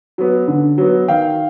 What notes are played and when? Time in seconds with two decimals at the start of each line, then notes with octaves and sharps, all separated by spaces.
0.18 F#3 B3
0.48 D3
0.78 F#3 B3
1.08 D#3 F5 G5